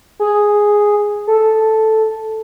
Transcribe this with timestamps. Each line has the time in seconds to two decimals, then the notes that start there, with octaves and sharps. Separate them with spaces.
0.20 G#4
1.27 A4